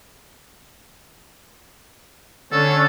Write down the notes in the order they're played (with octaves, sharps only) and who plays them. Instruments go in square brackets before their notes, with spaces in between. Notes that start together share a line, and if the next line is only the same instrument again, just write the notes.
[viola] D3 C#4 [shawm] A4